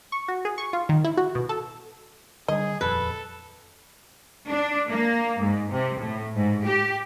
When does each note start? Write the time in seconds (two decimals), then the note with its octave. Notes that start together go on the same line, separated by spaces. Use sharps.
0.12 C#6
0.28 F#4
0.45 G#4
0.58 C#6
0.73 F4
0.89 D#3
1.04 E4
1.17 F#4
1.35 B2
1.49 A4
2.48 D3 G3 D4 G#4 D#5
2.81 D#1 F2 A4 B4
4.50 D4
4.91 A#3
5.41 G#2
5.71 C3
6.00 A2
6.36 G#2
6.65 G4